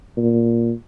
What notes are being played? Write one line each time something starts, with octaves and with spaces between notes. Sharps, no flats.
A#2